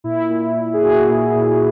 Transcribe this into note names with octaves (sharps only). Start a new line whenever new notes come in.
A#2 E4
A#2
A#2
G#4
A#2 F#4
A#2
A#2